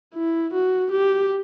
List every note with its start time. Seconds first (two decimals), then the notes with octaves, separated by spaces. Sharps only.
0.15 E4
0.53 F#4
0.92 G4